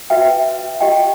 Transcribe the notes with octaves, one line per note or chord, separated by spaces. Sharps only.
F#4 B4 E5 G5
G4 D#5 G5